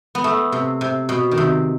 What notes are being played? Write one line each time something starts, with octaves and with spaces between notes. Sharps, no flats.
B3
A3
C3
C3
B2
D#3
C3